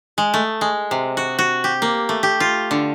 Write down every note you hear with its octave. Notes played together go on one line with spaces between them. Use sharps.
G#3
A3
G#3
C3
F#4
F#4
G4
A#3
A3
G4
F4
D3